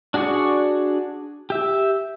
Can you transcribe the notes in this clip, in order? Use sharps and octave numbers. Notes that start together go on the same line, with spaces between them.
D4 F#4 G#4 D5 C#6
G4 E5